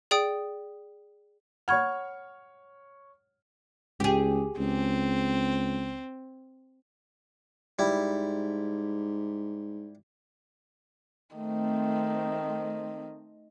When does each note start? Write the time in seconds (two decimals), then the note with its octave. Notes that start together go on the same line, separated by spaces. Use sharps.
0.11 G#4 D5 G5 D#6
1.68 C#5 F#5 B5 C#6 F6 G#6
4.00 C#2 G4 G#4
4.59 C#2 C4
7.79 G#2 G3 E4
11.36 D#3 A3 C4